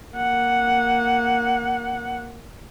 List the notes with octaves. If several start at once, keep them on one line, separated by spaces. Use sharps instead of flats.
A#3 F#5